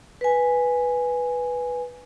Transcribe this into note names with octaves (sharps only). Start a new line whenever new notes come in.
B4 G#5